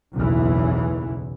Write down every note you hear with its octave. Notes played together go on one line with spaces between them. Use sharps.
F#1 B1 E2 E3